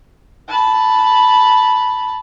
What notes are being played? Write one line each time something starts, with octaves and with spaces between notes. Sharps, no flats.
A5 B5